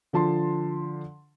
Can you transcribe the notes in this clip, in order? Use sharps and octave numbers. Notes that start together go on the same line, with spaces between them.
D3 F3 A5 C6